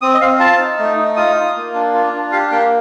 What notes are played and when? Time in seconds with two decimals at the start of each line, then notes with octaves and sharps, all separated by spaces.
0.02 C4 D#6
0.14 D#5
0.21 C4 F5
0.40 F4 A5
0.59 D#4
0.79 A3
0.97 D#4
1.17 F4 D#6
1.36 F4
1.56 A#3
1.74 D4
1.94 F4
2.13 D4
2.32 G4 F5
2.51 A#3 G5